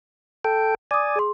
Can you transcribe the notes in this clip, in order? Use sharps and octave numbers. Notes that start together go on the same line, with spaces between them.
A4 G5
D5 G#5 D6 D#6
G#4 C6